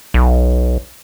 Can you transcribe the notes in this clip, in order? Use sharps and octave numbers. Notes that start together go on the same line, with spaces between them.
B1